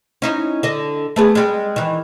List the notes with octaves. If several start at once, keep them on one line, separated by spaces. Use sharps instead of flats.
C#4 D#4 E4
D3 D#5
A3 B3 G#4
G3 G#3
D#3 E3